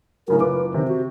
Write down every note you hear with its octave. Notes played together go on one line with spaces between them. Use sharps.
A2 C#3 F#3 A#4
F#1 F4 B4 D6
C3 D#3 C4
F#4